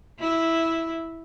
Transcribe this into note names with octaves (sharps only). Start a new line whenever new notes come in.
E4